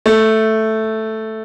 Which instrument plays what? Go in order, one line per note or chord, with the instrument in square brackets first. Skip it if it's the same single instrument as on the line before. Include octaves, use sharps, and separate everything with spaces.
[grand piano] A3